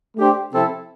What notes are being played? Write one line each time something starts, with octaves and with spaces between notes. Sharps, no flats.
A3 D4 G4 C5
C3 F3 C4 E4 A4